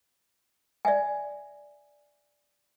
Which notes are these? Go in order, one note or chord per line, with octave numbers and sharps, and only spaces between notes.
D5 E5 G#5